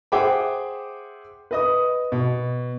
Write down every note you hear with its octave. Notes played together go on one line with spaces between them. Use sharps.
G#4 C5 E5 F#5 G5 D6
B4 D#5 D#6
B2